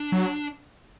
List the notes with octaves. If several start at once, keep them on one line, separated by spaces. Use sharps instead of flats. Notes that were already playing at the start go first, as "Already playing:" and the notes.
Already playing: D4
F#3